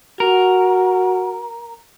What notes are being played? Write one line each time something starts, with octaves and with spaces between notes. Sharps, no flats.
F#4 A#4